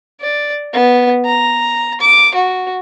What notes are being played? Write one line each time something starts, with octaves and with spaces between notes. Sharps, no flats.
D5
B3
A#5
D6
F#4